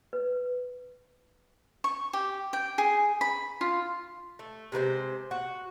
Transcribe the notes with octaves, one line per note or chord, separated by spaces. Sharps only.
B4
C#6
G4
G5
G#4
B5
F4
A3
C3 G#3 B4 C5
F#4